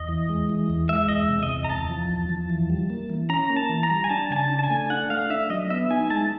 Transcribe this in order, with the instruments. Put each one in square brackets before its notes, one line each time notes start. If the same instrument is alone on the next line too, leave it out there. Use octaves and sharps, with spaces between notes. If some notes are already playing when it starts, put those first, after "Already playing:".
Already playing: [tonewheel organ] E2 [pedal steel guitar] D#5
[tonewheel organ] E3
G#3
E3
E2
[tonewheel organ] G#3 [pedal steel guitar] E5
[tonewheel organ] E2 [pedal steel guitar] D#5
[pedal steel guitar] E5
[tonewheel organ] C3
[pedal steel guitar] D#5
[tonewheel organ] E2
[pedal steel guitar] A#5
[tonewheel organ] E2 [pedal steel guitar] A5
[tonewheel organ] F3
E2
F3
E3
G3
A#3
E3
[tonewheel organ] C#4 [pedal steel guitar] A#5
[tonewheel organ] A#3
[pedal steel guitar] A5
[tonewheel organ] E3
[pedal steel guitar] A#5
[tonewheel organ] G3
[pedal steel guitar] G#5
[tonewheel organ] D4 [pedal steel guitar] A5
[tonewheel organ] C#3 [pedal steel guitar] G#5
[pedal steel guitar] A5
[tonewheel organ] D4
[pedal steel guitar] A5
G#5
[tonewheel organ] A3
[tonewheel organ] D4 [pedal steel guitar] F#5
[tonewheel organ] A3 [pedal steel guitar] F5
[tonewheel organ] D4 [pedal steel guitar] E5
[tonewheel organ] F#3 [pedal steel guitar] D#5
[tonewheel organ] B3 [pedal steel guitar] E5
[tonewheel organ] D#4 [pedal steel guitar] G#5
[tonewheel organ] G#3 [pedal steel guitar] A5